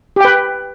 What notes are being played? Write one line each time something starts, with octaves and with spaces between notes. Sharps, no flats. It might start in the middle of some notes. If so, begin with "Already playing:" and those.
G4 B4 G5